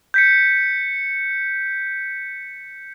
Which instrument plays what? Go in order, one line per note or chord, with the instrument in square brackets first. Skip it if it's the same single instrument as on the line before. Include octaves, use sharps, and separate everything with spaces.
[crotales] G6 B6 C#7